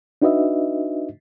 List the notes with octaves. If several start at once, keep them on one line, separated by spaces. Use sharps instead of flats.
D4 D#4 F#4 B4 D#5 E5